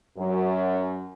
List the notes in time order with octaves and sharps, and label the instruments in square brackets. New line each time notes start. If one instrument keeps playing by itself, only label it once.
[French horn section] F#2